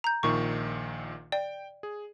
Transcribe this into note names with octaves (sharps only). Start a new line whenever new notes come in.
A#5 G6
A#1 A#2 D#3 C#6
D5 G5
G#4